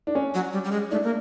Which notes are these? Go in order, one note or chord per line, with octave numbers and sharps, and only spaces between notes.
D4
C#4
F#3
G3
G3
G#3
A3 D4
A#3